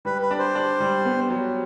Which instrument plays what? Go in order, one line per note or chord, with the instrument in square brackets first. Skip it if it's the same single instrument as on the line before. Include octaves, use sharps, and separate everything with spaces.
[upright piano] G3 [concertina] B4
[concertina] B4
[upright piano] D4
[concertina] C5
[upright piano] D4
G3
B3
F#3